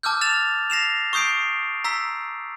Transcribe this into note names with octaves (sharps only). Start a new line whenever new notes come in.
A5 D6 E6 F6 G6
F6 A6 E7 F7
A#6 C7 E7 F7
C#6 D#6 G6 C7 D7
A#5 E6 B6